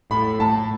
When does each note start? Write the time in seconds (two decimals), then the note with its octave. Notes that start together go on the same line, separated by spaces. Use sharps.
0.11 A2 B5
0.40 A2 A5